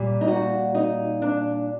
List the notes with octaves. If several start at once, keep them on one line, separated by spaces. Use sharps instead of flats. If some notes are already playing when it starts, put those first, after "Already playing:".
Already playing: A#2 G3
D#4
F#4
D#4
D4